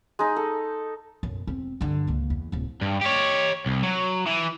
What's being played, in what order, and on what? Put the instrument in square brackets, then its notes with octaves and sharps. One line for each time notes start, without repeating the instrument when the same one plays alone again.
[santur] G#3 D#4
A4
[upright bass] B1 F#2
E1 C4
G2 D3
C#2 A#3
E2
D1 C2
[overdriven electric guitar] G2
G4 C#5
C2
F#3
E3